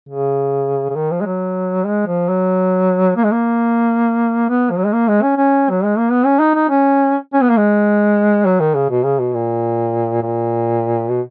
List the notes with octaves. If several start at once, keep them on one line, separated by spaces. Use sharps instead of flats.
C#3
C#3
D#3
F3
G#3
F#3
G#3
F3
F#3
A#3
G#3
A#3
B3
F3
F#3
G#3
A#3
G#3
C#4
C#4
F#3
G#3
A#3
B3
C#4
D#4
D#4
C#4
C#4
B3
A#3
G#3
F#3
D#3
C#3
B2
C#3
B2
A#2
A#2
B2